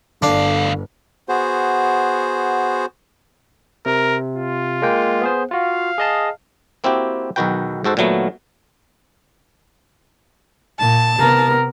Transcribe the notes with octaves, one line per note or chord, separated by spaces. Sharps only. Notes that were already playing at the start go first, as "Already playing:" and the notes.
G1 D2 D3 D4 F5
B3 F#4 G#4 C5
C3 A#4
F4
G#3 A#3 G5
B3 G#4 C5
F4 F#4 F5
G#4 D#5 A5
A#3 C4 E4 F#4 G4
B1 E2 D#3 F#4 B4 G5
G#2 F#4 A4 C5
A#2 D#3 F#3 A3 B3
A#2 A5
C3 B3 A#4